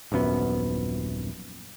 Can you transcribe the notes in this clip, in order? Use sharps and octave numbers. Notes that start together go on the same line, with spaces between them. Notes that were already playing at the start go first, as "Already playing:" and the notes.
D#1 A#1 F#2 B3